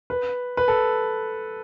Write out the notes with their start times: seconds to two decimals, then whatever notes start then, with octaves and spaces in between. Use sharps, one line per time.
0.10 B4
0.57 B4
0.68 A4